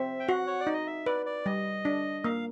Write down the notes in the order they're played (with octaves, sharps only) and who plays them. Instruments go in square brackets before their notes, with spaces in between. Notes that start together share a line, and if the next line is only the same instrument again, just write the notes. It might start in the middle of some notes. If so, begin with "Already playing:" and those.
Already playing: [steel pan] C4 [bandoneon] E5
[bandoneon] G5
[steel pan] F#4 [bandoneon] F#5
[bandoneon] C#5
D5
[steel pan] D#4
[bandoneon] D#5
E5
[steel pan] B4 [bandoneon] D5
[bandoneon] D5
[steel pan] G3 [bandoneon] D#5
[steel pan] D4
[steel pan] A#3 [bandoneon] F5